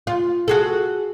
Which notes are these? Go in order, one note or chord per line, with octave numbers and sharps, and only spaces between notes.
F4
F#4 G#4 A4